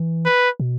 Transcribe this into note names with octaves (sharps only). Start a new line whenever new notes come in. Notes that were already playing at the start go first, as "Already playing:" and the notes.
Already playing: E3
B4
B2